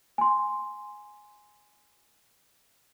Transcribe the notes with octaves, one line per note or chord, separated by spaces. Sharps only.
G#5 C6